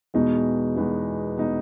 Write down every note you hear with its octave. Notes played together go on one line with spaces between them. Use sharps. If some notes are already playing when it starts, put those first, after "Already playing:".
E2 B2 G#3 B3 D#4
E2 B2 G#3 B3 D#4
B2 G#3 B3 D#4